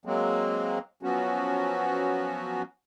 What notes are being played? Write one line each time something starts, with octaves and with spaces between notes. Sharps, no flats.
F#3 G#3 A#3 C4
F3 F#3 B3 C#4 F#4